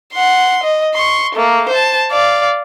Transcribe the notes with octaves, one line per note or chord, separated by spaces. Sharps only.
F#5 C6
D#5
C6 C#6
A3 A#3
C5 A5
D5 F5